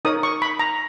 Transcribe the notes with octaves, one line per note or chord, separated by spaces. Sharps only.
D#4 A#4 C#5 D#6
C#6
B5
A#5